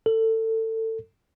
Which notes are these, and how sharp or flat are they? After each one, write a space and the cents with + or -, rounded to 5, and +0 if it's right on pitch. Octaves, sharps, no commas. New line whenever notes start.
A4 +25